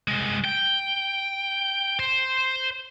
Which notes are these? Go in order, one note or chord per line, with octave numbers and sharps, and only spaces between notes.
C2 G#3
G5
C5